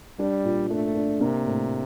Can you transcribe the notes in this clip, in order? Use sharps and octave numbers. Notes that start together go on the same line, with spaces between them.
G3 D4
A#2
A3 D4
D4
C3 A#3
A2